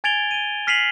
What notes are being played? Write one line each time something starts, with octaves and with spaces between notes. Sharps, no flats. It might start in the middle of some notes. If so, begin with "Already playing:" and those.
G#5 G#6 A6 D7 F7 G7
D#7 G7
F6 B6 C7 D#7 F7 F#7